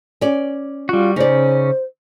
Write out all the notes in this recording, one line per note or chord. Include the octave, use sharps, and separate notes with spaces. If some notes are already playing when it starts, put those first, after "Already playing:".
C#4 D5
G3 F4 F#4
C#3 C#4 D#4 C5 D5